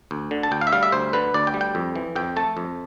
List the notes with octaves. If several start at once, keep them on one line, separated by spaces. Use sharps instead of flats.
D2
D3
A5
D2 G5
F5
E5
G3 F5
E5
D2 C5
D3 B4
D2 D5
G5
G3
G5
F2
E3
F2 G5
A3 A5
F2